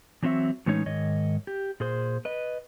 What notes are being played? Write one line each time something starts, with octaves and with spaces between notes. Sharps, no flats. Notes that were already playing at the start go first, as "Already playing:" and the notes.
E3 F#3 C4 F#4 E5
A2 E3 G#3 C#4 D#4 C#5
G#2 D#3 C#5 D#5
G4
A#2 G#4 C5
B4 D#5